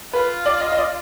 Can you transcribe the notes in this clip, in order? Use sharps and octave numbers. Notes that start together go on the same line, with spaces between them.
F4 B4
D5
D#5
D#5
D5